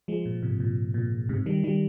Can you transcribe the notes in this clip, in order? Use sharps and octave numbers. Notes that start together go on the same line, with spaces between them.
F3 G#3
A#2
G#2 C3
A#2
A#2
G#2 C3
D#3 G3
D#3 G3